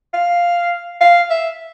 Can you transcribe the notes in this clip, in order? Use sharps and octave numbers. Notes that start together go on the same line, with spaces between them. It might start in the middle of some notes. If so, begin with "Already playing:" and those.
F5
F5
E5